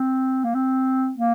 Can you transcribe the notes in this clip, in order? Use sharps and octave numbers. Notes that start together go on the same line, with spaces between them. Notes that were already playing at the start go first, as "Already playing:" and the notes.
Already playing: C4
A#3
C4
A#3